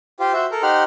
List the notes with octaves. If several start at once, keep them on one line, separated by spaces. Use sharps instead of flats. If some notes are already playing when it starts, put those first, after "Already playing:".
F4 G4 C5
F#4 C5 E5
A4 A#4
D#4 G4 C5 F#5 F6